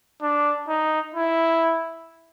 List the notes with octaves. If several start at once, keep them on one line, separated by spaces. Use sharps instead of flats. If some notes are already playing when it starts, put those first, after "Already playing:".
D4
D#4
E4